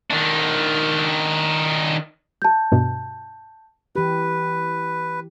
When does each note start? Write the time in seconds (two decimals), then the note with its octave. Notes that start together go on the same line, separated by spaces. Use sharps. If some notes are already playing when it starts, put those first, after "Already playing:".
0.11 D#3 D4
2.42 A5 G6
2.72 G2 B2
3.96 E3 G4 B4